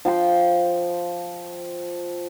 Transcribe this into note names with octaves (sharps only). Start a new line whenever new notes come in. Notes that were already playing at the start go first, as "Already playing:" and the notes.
F3 G5 C6